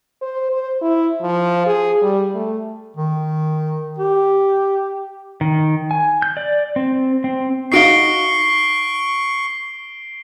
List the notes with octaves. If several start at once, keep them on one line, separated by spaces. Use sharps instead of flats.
C5
C5
E4
F3
G#4
G3
A3
D#3
G4
D#3
G#5
G6
D5
C4
C4
D#4 F#4 F5 C#6 C7 D7 G7